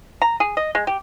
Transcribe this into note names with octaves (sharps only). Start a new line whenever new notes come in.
A#5
G#4
D#5
G#3
G4